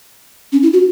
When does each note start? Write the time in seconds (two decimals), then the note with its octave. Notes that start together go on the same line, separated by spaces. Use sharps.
0.52 C#4
0.63 E4
0.73 F#4